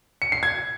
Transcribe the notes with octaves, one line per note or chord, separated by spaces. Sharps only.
C#7
C7
G#6